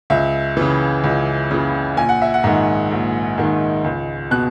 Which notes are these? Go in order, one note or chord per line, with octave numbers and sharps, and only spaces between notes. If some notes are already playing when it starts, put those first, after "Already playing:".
C#2 E5
C#3 E3
C#2
C#3 E3
A#1 G#5
F#5
E5
F#5
G#2 D#3
A#1
G#2 D#3
C#2
B2 F#6